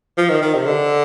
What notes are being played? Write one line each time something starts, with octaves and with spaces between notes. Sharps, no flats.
F3
D#3
D#3
C3
D3